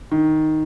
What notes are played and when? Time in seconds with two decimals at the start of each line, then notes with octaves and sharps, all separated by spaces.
0.12 D#3